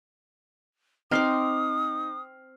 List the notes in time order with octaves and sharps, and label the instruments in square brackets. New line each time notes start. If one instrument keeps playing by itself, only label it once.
[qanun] C4 C6 D6 [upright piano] D#4 F6 C7 [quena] D#6